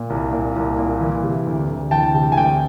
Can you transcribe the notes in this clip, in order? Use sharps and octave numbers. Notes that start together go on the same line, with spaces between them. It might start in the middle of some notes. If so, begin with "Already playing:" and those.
Already playing: A#2
C2
A#2
C2
A#2
E3
C3
D2
D2
E3 G5 A5
C3
G#5
D2 G5